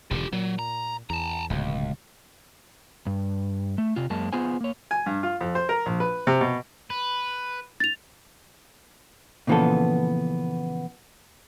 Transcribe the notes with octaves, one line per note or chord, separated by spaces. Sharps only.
E1 A#2 D3 F4 G4
A#2 F#3
A#5
E2 A5 A#5
D1 C#2 B2
G2
A3
C3 F4
F#2 G#3 A#3 A5
B3 F4 G#4 C5 G#5
A#3 C#5
G#5
G2
F4
F2
C5
A#4
A#1
B4
C3
B2
B4
A6 F7
A#2 C#3 E3 F3 B3 A4